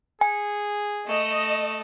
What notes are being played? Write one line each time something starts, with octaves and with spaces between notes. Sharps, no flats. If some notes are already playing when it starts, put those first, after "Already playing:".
G#4 G#5
A3 D#5